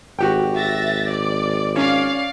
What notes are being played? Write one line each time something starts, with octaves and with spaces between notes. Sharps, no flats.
G#1 F#4 G4 G5
E5 A6 A#6
D5
C#4 D5 F5